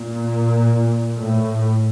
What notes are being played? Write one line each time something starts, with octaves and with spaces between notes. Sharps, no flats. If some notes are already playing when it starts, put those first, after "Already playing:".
Already playing: A#2
A2